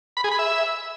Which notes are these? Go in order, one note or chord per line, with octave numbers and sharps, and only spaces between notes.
B5
G#4
B5
E5